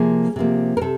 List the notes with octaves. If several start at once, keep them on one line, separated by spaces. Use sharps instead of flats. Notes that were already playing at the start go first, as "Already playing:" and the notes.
Already playing: C3 F3 A#3 G#4
C3 F3 A#3
A#4
C3 A4